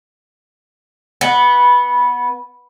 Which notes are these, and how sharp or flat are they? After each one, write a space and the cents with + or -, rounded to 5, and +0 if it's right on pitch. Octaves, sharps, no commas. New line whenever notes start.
B3 -10